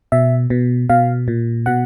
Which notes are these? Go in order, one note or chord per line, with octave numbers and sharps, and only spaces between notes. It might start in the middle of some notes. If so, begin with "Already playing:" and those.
B2 E5
B2
B2 F5
A#2
B2 F#5